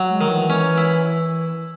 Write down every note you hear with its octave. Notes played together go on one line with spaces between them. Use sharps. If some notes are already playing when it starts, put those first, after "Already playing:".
Already playing: F#3
G#3
D#3
E3
C#4
E4